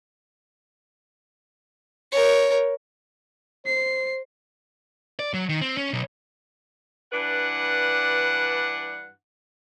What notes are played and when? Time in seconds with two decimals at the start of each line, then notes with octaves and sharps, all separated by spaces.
2.12 A#4 C#5
3.66 C5 C7
5.19 D5
5.34 F#3
5.49 D#3
5.61 C4
5.77 C#4
5.93 B1
7.13 G2 E3 D4 B4 F#5